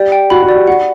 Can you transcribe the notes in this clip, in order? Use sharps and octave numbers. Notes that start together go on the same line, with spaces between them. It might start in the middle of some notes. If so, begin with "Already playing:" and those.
Already playing: G4 D5
G5
F#4 B5
F#4
D5
G4
F#4 F#5